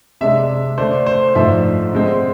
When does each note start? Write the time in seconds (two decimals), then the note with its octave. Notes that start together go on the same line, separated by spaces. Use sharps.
0.21 C3 G#3 D4 E5
0.78 D3 A3 D4 C5
1.06 C5
1.35 G#2 F3 A3 D4 E5
1.93 D3 G#3 C4